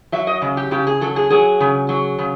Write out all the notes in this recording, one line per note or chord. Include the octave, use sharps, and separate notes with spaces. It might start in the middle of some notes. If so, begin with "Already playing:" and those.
F#3 E5
D#5
C#3
G4
C#3 G4
G#4
F#3 A4
G#4
F#3 G#4
C#3
F#3
C#3